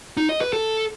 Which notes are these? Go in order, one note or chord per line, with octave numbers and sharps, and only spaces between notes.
D#4
D#5
B4
A4